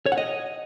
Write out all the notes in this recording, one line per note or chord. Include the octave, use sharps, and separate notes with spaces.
C#5
F#5
D#5